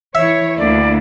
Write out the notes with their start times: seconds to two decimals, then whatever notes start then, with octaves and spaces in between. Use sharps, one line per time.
0.15 E3 E4 C#5 E5
0.58 D2 A#3 E4 D5